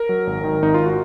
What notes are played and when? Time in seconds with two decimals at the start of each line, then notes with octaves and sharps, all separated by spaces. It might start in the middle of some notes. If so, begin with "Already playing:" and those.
Already playing: A#4
0.09 F#3
0.27 G#1
0.44 D#3
0.62 G#1 D#4
0.74 F4
0.86 F#4